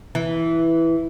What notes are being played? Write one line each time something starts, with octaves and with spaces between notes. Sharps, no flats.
E3